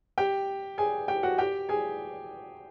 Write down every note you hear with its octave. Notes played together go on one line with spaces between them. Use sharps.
G4 G5
G#4 G#5
G4 G5
F#4 F#5
G4 G5
G#4 G#5